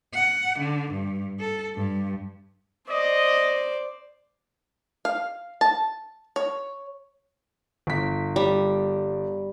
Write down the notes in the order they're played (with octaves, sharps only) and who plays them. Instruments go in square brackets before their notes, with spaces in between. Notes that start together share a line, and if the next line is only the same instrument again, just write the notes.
[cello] F#5
D3
G2
A4
G2
[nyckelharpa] C5 D5 [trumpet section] D#5
[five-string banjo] F5
A5
C#5
[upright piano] G1 B6
[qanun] G3